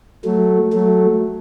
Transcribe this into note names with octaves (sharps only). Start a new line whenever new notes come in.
F#3 A3
F#3 A3